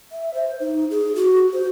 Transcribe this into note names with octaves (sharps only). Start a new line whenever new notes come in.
E5
C5
D#4
G#4
F#4
C5